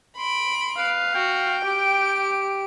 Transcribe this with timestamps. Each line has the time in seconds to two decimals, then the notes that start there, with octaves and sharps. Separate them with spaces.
0.17 B5 C6 D7
0.77 B4 F5
1.14 F#4 G5
1.64 G4 D7